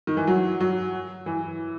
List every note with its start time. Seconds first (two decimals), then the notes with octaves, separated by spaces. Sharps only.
0.07 D#3
0.17 E3
0.27 F#3
0.60 F#3
1.26 E3